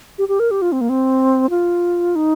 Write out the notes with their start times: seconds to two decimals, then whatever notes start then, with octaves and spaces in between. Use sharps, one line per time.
0.18 G4
0.28 G4
0.39 A#4
0.51 G4
0.62 F4
0.72 C4
0.81 A#3
0.89 C4
1.50 F4
2.15 D#4